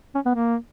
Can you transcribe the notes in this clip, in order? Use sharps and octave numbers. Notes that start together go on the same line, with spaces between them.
C#4
B3
A#3